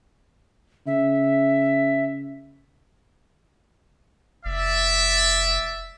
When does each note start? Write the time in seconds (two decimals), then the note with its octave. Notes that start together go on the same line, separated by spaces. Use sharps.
0.87 C#3 E5
4.45 F1 D5 E5